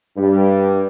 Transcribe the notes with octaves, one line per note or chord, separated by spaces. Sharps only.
G2 G3